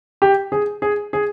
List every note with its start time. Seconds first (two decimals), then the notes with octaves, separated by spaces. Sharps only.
0.22 G4
0.52 G#4
0.82 G#4
1.13 G#4